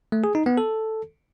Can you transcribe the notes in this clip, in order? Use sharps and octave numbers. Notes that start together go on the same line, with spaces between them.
A3
G#4
D#4
B3
A4